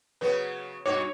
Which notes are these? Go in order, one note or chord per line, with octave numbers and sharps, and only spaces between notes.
C#3 F#3 B3 B4
G2 B2 F#4 C#5 D6